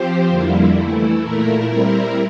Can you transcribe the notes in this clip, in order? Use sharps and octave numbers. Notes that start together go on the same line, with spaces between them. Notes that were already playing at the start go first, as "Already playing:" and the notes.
Already playing: F3 C4 G4 C5
F2 D3 G3 A#3 E4
E3 A3 E4
A#2 A3 E4 A#4
G3 C4 E4 A#4